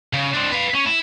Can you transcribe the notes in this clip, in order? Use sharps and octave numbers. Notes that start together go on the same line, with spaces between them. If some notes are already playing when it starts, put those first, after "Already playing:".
C#3
C4 D4
B4 F5
C#4
E4